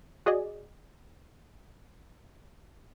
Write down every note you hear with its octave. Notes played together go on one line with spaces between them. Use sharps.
F#4 G#4 D5 D#5